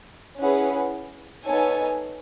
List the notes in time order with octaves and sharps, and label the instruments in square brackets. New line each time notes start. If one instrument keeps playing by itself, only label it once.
[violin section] C#4 E4 G#4 B4 F#5
B3 D#4 A4 C#5 G#5